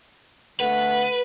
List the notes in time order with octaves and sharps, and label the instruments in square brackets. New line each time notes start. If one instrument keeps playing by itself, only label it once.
[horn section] D3 A3 F#5 [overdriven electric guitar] B4